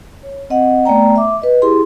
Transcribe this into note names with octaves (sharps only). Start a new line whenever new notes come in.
C#5
C4 D#5 F#5
A3 B3 D5 G5 A#5
E5 D6
B4 D#5
E4 G4 G#4 C6